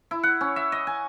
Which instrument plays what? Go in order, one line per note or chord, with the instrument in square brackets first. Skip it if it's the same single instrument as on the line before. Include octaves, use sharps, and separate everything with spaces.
[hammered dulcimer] E4
F#5
C#4
E5
D#5
G#5